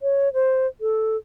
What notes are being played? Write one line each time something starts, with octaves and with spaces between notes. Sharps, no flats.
C#5
C5
A4